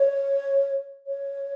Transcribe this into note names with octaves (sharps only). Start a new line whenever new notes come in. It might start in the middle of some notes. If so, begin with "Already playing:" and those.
Already playing: C#5
C#5